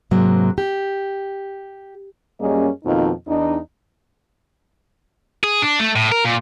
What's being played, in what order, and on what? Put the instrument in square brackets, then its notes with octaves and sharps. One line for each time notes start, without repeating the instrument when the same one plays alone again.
[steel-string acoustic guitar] G#2 C3 F#3 A#3
G4
[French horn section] F#2 G3 A#3 C#4 G#4 D#5
F2 B2 D#3 F3 A#3 D#4
E2 D4 D#4
[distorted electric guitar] G#4
D4
A3
A2
A#4
A#2